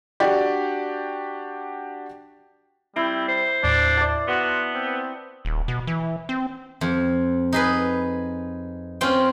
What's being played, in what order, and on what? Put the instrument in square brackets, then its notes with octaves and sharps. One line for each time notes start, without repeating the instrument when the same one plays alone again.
[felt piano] D4 F#4 G4 D5
[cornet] G3 [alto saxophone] C4 [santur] E4
[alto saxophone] C5
[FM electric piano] D#2 A2 [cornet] D4
[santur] D5 A5
[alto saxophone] B3 [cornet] F#4 [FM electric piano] C6
[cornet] C4
[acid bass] D#1
B2
E3
C4
[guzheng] F2
D#4 G#4 B4
C4 C#4 F4 G5